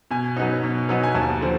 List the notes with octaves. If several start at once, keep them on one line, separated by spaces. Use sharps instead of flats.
B2 G#5
F#3 B3 D#4
B2
F#3 B3 D#4
G#5
D#2 A5
D3 F3